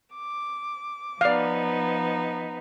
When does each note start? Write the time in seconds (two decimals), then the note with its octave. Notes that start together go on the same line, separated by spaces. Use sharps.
0.14 D6
1.21 F3 B3 D#4 D5 F5